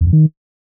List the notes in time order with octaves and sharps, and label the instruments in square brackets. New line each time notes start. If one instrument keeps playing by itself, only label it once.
[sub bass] E2
F2
D#3